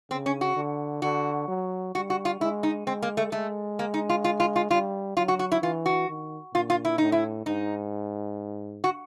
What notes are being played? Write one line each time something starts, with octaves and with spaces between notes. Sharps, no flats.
C#3 C4
C#4
F#4
D3
D3 F#4
F#3
G3 F#4
F#4
F4
G#3 E4
D#4
G#3 C4
A#3
A3
G#3 A3
A#3
D#4
F4
F4
F4
F4
G3 F4
F#3 F4
F#4
F#4
E4
E3 F4
F#4
D#3
A#2 F4
F4
E4
A2 D#4
E4
G#2 D#4
F#4